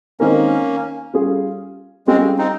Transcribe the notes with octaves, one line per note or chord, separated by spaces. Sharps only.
D#3 G#3 A#3 C4 C#4 D#4 A#4
G3 C#4 F4 G#4
G3 G#3 C4 C#4 F4 G#4
C4 D#4